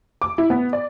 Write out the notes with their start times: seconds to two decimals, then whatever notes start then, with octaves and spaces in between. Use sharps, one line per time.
0.22 D6
0.38 E4
0.50 B3
0.73 D5